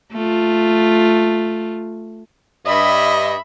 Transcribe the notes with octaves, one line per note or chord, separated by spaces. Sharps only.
A3 F4
G2 D#5 E5 B5